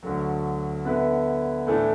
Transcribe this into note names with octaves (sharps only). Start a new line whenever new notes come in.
D2 D3 F#3
D3 B3 E4 B4
A2 E3 A3 D4